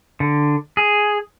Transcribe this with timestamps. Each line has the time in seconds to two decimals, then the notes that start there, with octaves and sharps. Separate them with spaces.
0.20 D3
0.77 G#4